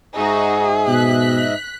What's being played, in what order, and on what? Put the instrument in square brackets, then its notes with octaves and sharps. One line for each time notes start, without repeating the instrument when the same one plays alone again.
[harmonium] G#2 D#5 E5 [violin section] D#4 F#4 [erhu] G#4
[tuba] B2 [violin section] F#6 B6